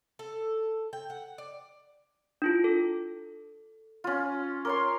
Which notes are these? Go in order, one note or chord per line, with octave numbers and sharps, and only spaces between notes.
A4
G5
F#5
D5
D4 E4 F4
A4
C#4 F4
A#4 C#5 C6 D6